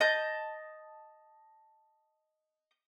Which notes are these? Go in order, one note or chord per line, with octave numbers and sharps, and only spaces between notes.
D#5 A5 G6